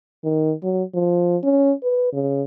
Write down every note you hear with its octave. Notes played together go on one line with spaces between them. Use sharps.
D#3
F#3
F3
C#4
B4
C#3